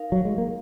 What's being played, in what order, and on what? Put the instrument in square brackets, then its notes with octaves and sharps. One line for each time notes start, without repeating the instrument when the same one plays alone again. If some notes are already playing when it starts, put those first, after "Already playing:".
Already playing: [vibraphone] D#4 A#4 F5
[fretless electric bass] F#3
G#3
A#3